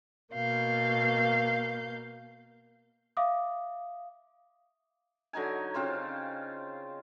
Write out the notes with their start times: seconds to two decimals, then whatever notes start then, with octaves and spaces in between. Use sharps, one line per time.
0.33 B2 A#3 F5 G6
3.17 E5 F5 D6 D#6
5.33 D3 F#3 D#4 G#5
5.74 C#3 C4 F4 C5